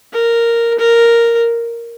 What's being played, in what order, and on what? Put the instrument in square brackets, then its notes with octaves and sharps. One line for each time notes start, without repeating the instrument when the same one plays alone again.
[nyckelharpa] A#4
A#4